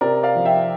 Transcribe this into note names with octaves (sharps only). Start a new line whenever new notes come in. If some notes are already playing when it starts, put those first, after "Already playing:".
C3 A#4 D5
D5 F5
F3
E5 G5